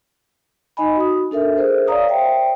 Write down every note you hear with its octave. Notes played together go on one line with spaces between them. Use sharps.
D#4 D#5 G#5 B5
F#4 D#6
D4 A4 A#4 E5
G#4 A#4 C5
C#5 D5 F5 A#5 D#6
C5 E5 G5